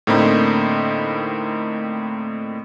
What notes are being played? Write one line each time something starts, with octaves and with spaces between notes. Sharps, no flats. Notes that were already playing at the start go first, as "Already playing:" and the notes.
A2 D3 A#3 C4 D#4 B5